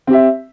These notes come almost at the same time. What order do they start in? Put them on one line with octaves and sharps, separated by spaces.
C4 G4 E5